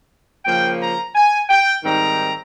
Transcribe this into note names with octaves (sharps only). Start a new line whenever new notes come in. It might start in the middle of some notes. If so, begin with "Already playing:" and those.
C#3 F3 A#3 G5
A#5
G#5
G5
G#2 D#3 G3 C4 D#4 A#5